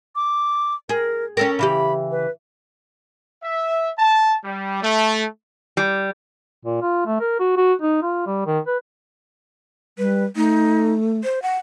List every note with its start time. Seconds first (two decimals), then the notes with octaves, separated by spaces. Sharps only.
0.16 D6
0.89 G#4 A#4
1.37 C#4 A4 A#4 G5
1.59 C#3 E3 G4 B5
2.11 B4
3.44 E5
3.99 A5
4.44 G3
4.83 A3
5.77 G3
6.65 A#2
6.82 F4
7.06 A3
7.20 A#4
7.40 F#4
7.57 F#4
7.81 D#4
8.02 F4
8.26 G3
8.46 D#3
8.67 B4
9.98 G3 B4
10.36 A3 D#4
11.23 C5
11.42 F#5